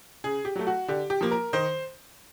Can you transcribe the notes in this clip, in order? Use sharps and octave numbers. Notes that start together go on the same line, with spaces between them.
C#3 G#4
G4
F#3 A3
F#4
D3 G4
G4
F3 A#3
A#4
D#3 C5